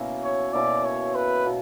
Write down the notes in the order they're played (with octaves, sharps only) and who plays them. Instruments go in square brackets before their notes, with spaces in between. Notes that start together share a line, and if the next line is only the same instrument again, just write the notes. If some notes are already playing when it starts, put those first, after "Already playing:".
Already playing: [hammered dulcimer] B2 A#3 C#4 E4
[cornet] C#5
[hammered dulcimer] B2 A#3 C#4 E4 [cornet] D5
[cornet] C#5
B4
[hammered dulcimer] B2 A#3